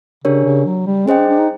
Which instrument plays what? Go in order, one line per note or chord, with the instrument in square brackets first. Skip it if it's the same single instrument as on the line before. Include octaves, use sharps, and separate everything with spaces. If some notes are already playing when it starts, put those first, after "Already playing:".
[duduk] C#3 [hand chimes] D4 G4 A#4 C#5
[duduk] C#3
F#3
G3
[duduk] C#4 [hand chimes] G#4 C5 D#5 G5
[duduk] D4
D4
D#4